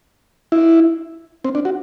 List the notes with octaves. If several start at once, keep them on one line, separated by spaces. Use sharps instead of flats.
E4
C4
D4
F#4